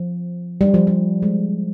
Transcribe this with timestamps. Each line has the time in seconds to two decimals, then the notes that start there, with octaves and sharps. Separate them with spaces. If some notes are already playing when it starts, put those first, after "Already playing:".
Already playing: F3
0.61 G3
0.74 F3
0.87 G3
1.22 G#3